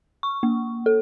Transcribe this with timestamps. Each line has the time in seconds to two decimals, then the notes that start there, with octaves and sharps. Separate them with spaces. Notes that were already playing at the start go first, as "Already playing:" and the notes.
0.23 C#6
0.43 A#3
0.86 A4